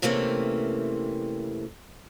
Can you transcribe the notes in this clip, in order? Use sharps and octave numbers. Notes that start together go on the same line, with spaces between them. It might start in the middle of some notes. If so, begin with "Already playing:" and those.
C3 E3 A3 A#3 C4 C#4